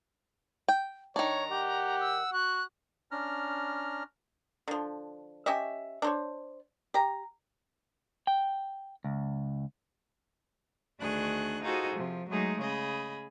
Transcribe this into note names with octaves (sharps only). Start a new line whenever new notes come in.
G5
D#3 D4 C#5 A#5
G4 F#5
E6
F#4 F#6
C#4 D4 A#5 F6
D3 F3
C#4 G4 D#5 E5
D4 C5 C#5
G4 A#5
G5
C#2
D2 D#3 D4 G#4 C#6 F#6
D#4 F4 F#4 G#4 A4 C5
C3 F3
F#3 G#3 A3 D#4 G#4
C#3 G#4 D#5 B5